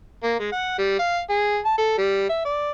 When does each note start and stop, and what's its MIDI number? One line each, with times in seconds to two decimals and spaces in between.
0.23 0.36 58
0.40 0.51 56
0.52 0.78 78
0.79 0.99 55
0.99 1.19 77
1.30 1.58 68
1.65 1.73 81
1.78 1.95 69
1.98 2.27 55
2.29 2.42 76
2.45 2.72 74